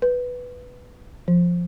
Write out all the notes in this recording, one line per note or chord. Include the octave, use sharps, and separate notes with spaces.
B4
F3